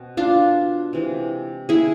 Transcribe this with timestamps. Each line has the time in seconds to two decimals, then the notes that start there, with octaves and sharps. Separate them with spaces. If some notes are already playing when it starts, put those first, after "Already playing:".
Already playing: B2 C4
0.17 D4 F4
0.93 C3 E3 G#3
1.69 E4 G#4